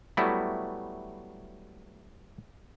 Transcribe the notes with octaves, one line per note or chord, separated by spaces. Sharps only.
F#3 G3 A3 B3 E4